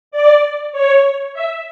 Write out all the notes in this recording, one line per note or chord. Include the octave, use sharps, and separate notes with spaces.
D5
C#5
E5